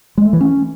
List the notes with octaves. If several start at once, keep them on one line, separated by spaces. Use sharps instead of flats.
G#3
A3
E3
C#4